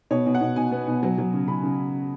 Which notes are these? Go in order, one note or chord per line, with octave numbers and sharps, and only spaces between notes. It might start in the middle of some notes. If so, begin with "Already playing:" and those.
B2 C#5
B2
F#5
B2
B2 G#5
B3
B2
F#3
F#3
C#3
C#3 B5
C#3